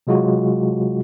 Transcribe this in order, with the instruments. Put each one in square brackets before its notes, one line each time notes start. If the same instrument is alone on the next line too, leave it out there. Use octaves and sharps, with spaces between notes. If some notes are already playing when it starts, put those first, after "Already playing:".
[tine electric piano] C3 F#3 G#3 F4 F#4